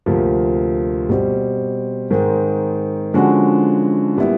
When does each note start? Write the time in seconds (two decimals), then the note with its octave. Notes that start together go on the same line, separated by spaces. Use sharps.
0.06 D2 C3 F3 A#3
1.09 B2 G3 C4
2.11 G#2 D#3 G#3 C4
3.14 D3 F3 G#3 C#4 F#4
4.16 A#2 G3 B3 E4